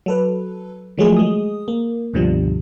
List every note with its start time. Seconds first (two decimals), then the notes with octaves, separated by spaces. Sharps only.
0.06 F#3 A4 B4
0.98 D#3 F3 F#3 G#3 A3 G#4
1.17 G#3 D#6
1.68 A#3
2.14 C#2 G2 B2 D3 F3 G3